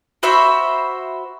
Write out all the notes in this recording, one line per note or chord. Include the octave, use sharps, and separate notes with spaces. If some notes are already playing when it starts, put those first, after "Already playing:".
F#4 C5 E5 B5